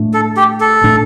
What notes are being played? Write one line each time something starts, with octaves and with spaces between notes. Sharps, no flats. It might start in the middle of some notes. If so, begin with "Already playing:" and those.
Already playing: A2 A3 D4
A4
G4
A4
A2 A3 D4